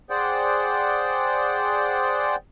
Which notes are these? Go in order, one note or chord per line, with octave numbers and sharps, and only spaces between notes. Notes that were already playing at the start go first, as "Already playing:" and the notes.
G#4 C5 D5 F#5 G5